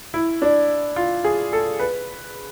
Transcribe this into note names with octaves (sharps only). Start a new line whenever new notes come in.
E4
D4
F4
G#4
A4
B4